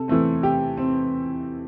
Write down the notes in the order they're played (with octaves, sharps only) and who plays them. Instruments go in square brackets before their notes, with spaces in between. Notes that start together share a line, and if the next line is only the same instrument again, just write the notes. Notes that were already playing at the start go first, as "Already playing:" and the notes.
Already playing: [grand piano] C3 A4
E3 A3 C4
C3 G4
C4